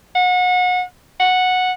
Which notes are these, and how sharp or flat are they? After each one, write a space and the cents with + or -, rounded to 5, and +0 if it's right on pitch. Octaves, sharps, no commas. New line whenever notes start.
F#5 -30
F#5 -10